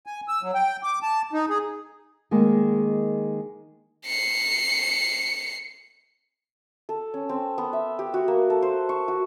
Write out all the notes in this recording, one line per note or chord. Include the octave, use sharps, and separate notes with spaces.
G#5
E6
F#3
G5
D6
A5
D#4
G#4
D#3 G#3 A#3
C7 C#7
A4
C#4
C4
B3
E5
G4
F#4
A#3
A4
C5
C#6
F#4